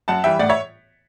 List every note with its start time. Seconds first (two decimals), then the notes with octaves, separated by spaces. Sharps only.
0.08 F#2 F#5 A5
0.24 E3 G3 E5 G5
0.39 A2 D5 F#5
0.49 C#5 E5